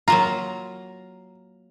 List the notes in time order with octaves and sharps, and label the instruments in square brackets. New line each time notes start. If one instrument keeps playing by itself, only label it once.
[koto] F#3 A#3 F4 [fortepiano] A#5